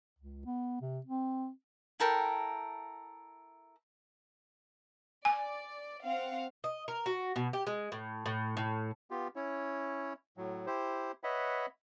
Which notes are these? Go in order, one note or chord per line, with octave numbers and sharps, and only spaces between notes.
C#2
B3
C3
C4
E4 A4 A#4 G5
D5 G#5
C4 F5 F#5
D#5
A#4
F#4
B2
G4
G#3
A2
A2
A2
B3 F4 G4
C#4 E4 C#5
A2 F#3
E4 G4 C5
B4 C#5 D#5 E5 F#5 B5